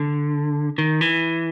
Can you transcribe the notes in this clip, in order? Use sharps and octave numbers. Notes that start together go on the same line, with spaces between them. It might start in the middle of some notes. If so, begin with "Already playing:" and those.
Already playing: D3
D#3
E3